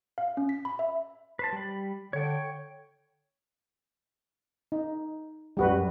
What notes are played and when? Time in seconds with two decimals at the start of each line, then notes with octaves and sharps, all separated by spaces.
0.18 F5
0.37 C#4
0.49 B6
0.65 B5
0.79 E5
1.39 B4 C5 A5
1.53 G3 B5
2.13 D3 C#5 G5
4.72 D#4
5.57 F#2 G3 F#4 B4